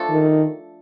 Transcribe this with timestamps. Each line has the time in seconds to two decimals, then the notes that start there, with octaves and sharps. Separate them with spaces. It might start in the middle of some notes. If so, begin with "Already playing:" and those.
Already playing: F3 A3 D4 A4
0.10 D#3